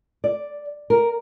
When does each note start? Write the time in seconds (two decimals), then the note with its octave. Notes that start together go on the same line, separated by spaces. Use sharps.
0.24 D5
0.90 A#4